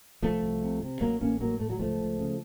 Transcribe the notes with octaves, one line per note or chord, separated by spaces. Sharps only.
C2 F3 A3
C2
C3
C3
A1 F#3 A#3
A1 A#3 C#4
A2 F#3 A#3
A2 A3
F#3
C#2 F3 A3
C#2
C#3